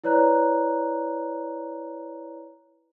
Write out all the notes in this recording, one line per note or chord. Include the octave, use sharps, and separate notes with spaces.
E4 B4 C#5 D5 A#5 F#6